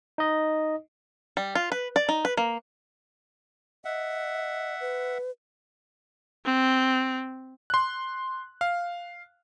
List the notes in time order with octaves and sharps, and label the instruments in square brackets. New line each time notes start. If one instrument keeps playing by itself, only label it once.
[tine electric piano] D#4 D#5
[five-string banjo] G3
F4
B4
D5
D#4
B4
A#3
[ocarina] D#5 [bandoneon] E5 F#5
[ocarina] B4
[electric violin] C4
[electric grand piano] C6 F#6
F5